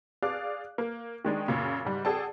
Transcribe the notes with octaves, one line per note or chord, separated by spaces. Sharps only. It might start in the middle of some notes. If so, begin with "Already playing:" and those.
G#4 D5 F5 D6 F#6
A#3
D#3 G#3 D4 D#4
F#2 A#2 C#3
G#2 G3
F#4 G#4 A4 D5 G5 A5